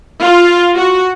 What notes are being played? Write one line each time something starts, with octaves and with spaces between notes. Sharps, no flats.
F4
F#4